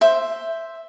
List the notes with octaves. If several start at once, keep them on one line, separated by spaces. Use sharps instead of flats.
C5 E5